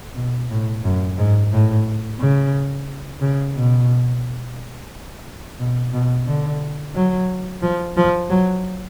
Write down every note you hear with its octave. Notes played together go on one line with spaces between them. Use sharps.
B2
A2
F#2
G#2
A2
C#3
C#3
B2
B2
B2
D3
F#3
F3
F3
F#3